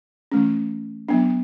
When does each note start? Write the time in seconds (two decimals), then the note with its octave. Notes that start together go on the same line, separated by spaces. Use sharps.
0.32 E3 A3 C#4
1.09 F#3 B3 D4